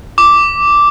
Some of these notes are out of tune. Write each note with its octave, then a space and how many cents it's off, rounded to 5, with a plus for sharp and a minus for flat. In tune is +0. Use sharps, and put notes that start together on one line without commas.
D6 -5